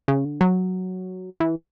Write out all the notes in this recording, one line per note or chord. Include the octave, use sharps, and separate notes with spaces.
C#3
D3
F#3
E3